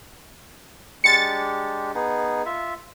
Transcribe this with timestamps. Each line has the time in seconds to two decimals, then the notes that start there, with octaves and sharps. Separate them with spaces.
1.04 G#3 D4 G4 A6 C#7
1.95 B3 D#4 G#4
2.46 F4 E5